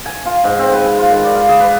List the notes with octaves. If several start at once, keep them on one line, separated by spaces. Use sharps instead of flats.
G#5
F4
G#2
C4
B4
G#5
F4
D#3
D5
F5
G#4
B4